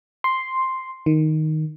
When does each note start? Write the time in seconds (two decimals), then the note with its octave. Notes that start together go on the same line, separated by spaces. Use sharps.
0.24 C6
1.06 D#3